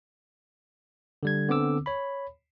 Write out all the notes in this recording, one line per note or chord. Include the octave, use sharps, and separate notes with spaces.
D3 G3 G#6
D3 B3 C4 D6 E6
C#5 B5